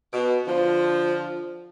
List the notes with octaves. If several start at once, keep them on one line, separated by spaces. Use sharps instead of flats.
B2
D3 F3